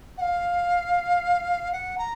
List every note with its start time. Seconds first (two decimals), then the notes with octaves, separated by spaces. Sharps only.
0.18 F#5
0.21 F5
1.72 F#5
1.98 A#5